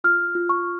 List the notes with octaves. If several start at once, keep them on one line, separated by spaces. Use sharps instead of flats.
F4 F6
F4
C#6